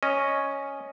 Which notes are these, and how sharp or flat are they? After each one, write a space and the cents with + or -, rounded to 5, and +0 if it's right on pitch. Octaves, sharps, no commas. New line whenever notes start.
C#4 +0 D#5 +0